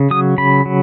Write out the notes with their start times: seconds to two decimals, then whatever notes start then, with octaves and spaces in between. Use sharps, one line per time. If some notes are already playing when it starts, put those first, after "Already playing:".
Already playing: C#3
0.11 F#3 D#6
0.38 C#3 B5
0.65 F#3